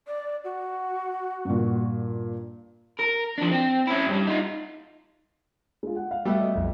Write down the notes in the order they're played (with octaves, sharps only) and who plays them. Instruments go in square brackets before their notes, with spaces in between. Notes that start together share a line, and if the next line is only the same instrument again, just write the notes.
[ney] D5
F#4
[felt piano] G2 A#2
[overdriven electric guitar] A#4
F3 D4
C4
C#4 E4
G2 G3
D#4 F4
[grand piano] G#3 F4
F#5
F5
[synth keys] G3 A3 B3 [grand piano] F#4 E5
[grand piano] D#5 E5
[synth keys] B1 F2